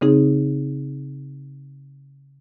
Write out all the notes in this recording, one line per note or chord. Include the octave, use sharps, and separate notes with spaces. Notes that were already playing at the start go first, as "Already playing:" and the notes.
C#3 C4 D#4 G#4